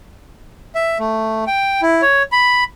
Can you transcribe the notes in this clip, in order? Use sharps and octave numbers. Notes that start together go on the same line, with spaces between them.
E5
A3
G5
E4
C#5
B5